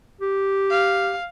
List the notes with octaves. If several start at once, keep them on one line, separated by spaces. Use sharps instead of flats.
G4
F5